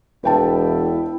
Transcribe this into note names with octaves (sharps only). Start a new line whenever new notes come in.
E1 E4 B4 G5 A5